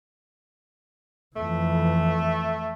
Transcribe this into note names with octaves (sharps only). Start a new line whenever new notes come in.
F2 E3 A3